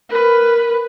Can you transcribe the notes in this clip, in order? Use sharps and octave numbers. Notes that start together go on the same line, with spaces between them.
A#4 B4